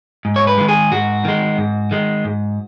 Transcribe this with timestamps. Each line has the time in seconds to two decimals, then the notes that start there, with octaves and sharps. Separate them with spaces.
0.25 G#2
0.36 C#5
0.47 B4
0.58 D#3 G#3
0.68 G#4
0.91 G#2 F#4
1.25 D#3 G#3
1.58 G#2
1.91 D#3 G#3
2.25 G#2